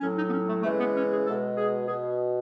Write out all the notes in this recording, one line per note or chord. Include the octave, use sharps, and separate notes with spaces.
A2 F#3 C#4
D#4
B3
C#4
A3
C#3 E3 G#3 A3
B3
C#4
G#4
B2 G#3 A4
G#4
B2 G#4